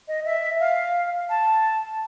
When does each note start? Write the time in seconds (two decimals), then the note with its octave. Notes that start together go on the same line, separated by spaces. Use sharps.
0.08 D#5
0.25 E5
0.60 F5
1.30 A5